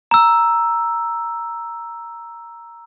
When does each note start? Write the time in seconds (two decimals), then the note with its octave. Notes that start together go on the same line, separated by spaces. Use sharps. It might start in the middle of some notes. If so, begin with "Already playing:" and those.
0.11 A#5 E6